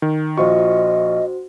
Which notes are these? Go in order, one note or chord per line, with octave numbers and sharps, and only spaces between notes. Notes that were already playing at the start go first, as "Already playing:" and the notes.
D#3
A#1 F4 F#4 C5 D#5 C#6